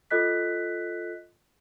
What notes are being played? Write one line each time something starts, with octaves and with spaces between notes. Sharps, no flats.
F4 A4 D#5 F#6 B6